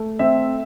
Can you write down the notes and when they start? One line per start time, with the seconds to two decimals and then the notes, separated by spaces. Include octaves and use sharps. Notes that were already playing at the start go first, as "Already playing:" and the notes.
Already playing: A3
0.19 C4 E5